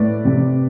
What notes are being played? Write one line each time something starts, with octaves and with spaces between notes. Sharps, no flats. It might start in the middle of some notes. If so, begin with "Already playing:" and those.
Already playing: A2 B4 D5
C3